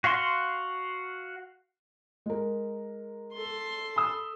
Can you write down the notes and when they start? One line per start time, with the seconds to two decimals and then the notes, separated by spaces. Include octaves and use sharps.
0.04 F#4 F5 F#5 C6
2.26 G#3 A#4
3.33 A4 C6
3.96 B5 D#6 E6